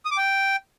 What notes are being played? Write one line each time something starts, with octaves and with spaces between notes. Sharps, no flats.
D#6
D6
G5